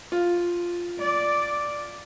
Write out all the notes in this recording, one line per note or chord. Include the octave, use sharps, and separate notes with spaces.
F4
D5